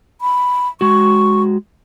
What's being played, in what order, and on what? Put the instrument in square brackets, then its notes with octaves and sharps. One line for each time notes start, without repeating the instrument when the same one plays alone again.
[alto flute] B5
[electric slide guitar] G#3 F#4 [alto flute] C#6